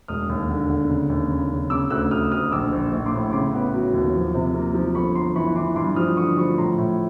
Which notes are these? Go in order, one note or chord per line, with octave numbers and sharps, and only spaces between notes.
E1 D#6 F6
D#2
D3
D3
C#3
D#2
C#3
C#3
C#3 D6 E6
D2 E6 F#6
D2 D#6 F6
D2 D#6 F6
A#1 D6 E6
A#1
A#1
C6 D6
A2
C#3 C6 D6
B3
F#3
D#2
F3
C3
A#3
F3
G1 B5 C#6
G1 A#5 C6
E3 B5 C#6
E3 C6 D6
G2 C6 D6
F3 D#6 F6
D3 C#6 D#6
F3 B5 C#6
A2 A#5 C6
A2